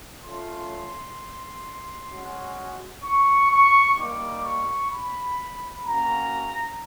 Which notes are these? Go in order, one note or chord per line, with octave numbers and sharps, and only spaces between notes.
A3 C#4 F4 C6
G#3 C#4 F#4
C#6
C#6
G3 A#3 D#4 D6
C#6
B5
A#3 C#4 F#4 A#5